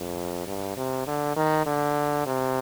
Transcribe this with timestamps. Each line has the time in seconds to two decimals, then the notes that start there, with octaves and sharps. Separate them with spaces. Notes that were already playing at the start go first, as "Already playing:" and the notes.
Already playing: F2
0.47 G2
0.77 C3
1.07 D3
1.36 D#3
1.66 D3
2.26 C3